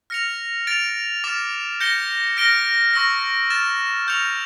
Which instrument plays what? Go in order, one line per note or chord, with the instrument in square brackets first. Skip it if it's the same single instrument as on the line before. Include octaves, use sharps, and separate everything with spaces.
[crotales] F6 A#6 C#7 F7
A6 D7 F7
D6 F6 A6 E7
G6 A#6 C#7 G7
F6 A#6 D7 G7
C#6 E6 A#6
F6 A6 E7
C#6 E6 G6 C#7 F7